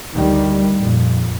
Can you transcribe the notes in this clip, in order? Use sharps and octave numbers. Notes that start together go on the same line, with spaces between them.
D2 D#3 G3
F2 A#2